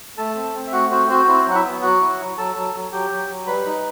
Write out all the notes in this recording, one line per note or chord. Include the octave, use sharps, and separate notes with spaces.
A3 A4 A5
C4
C4
E5
A3 F#4 F#5
C4 F#4 C5
C4 F#4 C5
C4 E4 C5
F#3 F#5
E4 E5
B3
F#3 F#4 F#5
E4
F#3
F#3 A4 A5
F#3
F#3
F#3 G4 G5
F#3
F#3
G3 B4 B5
D#4